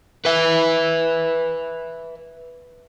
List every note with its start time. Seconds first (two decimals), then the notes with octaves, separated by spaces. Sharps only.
0.25 B4 E5